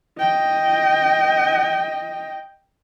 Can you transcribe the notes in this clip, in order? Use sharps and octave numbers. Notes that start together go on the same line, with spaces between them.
D#5 G5